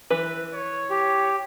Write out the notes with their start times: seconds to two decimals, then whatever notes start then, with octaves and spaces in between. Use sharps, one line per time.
0.10 E3 B4
0.54 C#5
0.90 G4